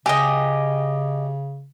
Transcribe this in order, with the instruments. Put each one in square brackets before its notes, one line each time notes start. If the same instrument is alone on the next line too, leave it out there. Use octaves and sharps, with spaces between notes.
[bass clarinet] C#3 [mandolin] G4 D#5 [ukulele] G#5